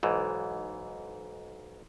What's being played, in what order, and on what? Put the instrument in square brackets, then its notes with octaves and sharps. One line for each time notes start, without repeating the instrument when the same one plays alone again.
[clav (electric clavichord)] B1 G#2 E3